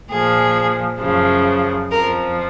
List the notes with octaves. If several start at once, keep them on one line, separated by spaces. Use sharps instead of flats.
A#2 F3 G#4
F#2 C#3 F3
F2 F3 A#4